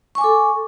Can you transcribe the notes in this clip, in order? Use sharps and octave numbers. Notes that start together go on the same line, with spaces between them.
A4 G#5 C#6 D6